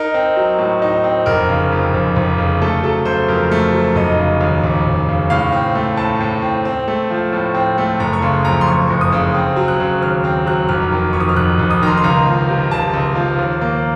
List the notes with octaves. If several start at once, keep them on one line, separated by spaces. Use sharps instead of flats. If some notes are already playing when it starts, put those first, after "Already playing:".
Already playing: D#4 A#4
C4
F#3
A2
D#4
C4
F1 A#4
C#3
F2
F1
F1
C#3
A3 A4
F#3 A4
C#3 C5
F2 A#4
A3
F#3
F1 D#5
C#3
D#2
F1
F1
C#3
A2 F5
C4
A3
A2 A5
A2
C4
C4
A3
F3
A2
C4
A3
F#1 A#5
C#6
C#3 C6
F2 A#5
C6
F#1 C#6
F#1
D#6
C#3
C4
F#3
F#6
C#3
D#2 F6
C4 F6
F#3 F#6
F1 F6
D#3
F2 C#6
D#6
F6
F1 F#6
F1
D#6
D#3 A#5 C6
C6
C#2 A#5
F3
C3
C#2 A5
C#2
F3
D#2
A#3